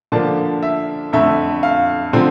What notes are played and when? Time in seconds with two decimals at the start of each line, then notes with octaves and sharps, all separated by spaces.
0.12 D3 F3 A#3 D4 A5
0.63 E5
1.13 F2 D3 A3 E5
1.63 F5
2.13 D3 F3 C4